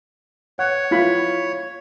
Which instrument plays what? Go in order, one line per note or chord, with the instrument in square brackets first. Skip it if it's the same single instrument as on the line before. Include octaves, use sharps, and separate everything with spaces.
[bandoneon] C#5 [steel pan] F#5
[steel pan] E4 F4 B5